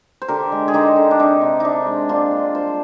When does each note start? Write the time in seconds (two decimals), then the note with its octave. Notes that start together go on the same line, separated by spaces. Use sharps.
0.22 C5
0.28 D3 G4 A#4
0.52 G#3
0.68 G#4
0.74 D3 D#4 G4
0.96 D3
1.11 D4
1.19 C3 D#4
1.41 C3
1.60 C3 D4 D#4
1.87 G#3
2.09 A#2 D4 F4
2.32 A#2
2.55 G3 C5